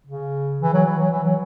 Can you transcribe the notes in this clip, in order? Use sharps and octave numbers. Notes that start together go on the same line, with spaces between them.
C#3
E3
F#3
E3
F#3
E3
F#3